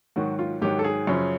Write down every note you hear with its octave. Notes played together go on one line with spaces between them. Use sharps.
G#2 D#3 F#3 F#4
F4
G#2 D#3 F#3 G4
A4
G#4
F#2 C#3 F3